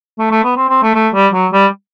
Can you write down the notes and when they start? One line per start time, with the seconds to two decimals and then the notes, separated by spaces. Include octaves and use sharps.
0.19 A3
0.31 A3
0.44 B3
0.56 C4
0.69 C4
0.83 A3
0.95 A3
1.14 G3
1.33 F#3
1.52 G3